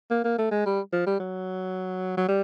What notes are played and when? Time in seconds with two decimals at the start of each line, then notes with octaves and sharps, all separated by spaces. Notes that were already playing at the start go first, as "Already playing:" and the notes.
0.10 A#3
0.24 A#3
0.38 A3
0.51 G#3
0.66 G3
0.92 F3
1.07 G3
1.19 F#3
2.17 F#3
2.28 G3